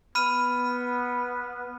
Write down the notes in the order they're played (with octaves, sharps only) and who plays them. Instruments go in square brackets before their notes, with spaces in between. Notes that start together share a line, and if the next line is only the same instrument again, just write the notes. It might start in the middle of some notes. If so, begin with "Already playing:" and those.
[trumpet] B3 [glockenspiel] B5 F6 D#7